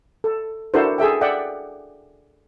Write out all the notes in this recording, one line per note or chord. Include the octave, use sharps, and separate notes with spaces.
A4
D4 E4 F#4 A4 A#4 C5
G#4 A4 E5 G5
D5 E5 F#5 G5